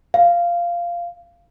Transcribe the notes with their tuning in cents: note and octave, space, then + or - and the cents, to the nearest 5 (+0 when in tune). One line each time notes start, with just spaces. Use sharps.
F5 -10